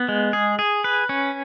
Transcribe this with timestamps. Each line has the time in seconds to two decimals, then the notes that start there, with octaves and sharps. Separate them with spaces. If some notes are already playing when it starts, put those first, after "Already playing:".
Already playing: B3
0.08 G#3
0.33 G#4
0.59 G#4
0.84 B4
1.09 C#4